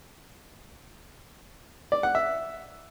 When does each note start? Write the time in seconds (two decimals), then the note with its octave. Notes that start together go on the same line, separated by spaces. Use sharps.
1.92 D5
2.03 F#5
2.15 E5